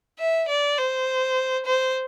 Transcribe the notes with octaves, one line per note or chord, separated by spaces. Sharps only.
E5
D5
C5
C5